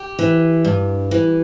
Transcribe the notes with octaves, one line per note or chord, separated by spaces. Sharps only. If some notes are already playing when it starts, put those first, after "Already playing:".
Already playing: G4
E3
G2
E3